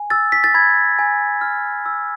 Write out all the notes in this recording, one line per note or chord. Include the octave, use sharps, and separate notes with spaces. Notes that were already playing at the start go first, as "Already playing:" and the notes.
Already playing: G#5
E6 A6
B6
A6
B5 G#6
G#5
F6
E6